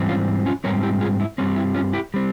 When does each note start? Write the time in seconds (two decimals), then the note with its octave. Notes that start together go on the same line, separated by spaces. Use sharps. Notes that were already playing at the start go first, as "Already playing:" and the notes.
Already playing: G#2 E3 G3 C4
0.09 C#4 F4
0.46 C#4 F4
0.64 G#2 E3 G3 C4 A#4 C#5
0.83 E4 G4
1.01 F4 G#4
1.20 E4
1.38 G2 G3 C4 C#4
1.56 E4
1.75 C#4 F4
1.93 E4 G4
2.14 G3 C4